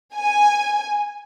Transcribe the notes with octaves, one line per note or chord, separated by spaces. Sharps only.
G#5